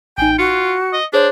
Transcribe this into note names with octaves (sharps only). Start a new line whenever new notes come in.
A1 D#4 G5 G#5
F4 F#4 C#7
D#5
D4 G#4 C5 C#5